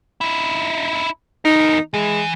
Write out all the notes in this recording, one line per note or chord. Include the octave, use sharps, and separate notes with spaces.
D#4 E4
E2 D#4 A#4
E3 G#3